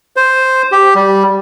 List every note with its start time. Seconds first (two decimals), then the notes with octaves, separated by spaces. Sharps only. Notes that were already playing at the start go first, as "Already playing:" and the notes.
0.16 C5
0.72 G4
0.95 G3